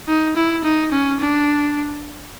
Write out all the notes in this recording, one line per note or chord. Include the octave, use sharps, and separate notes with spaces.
D#4
E4
D#4
C#4
D4